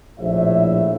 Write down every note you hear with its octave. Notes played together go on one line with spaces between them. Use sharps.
A#1 A2 E5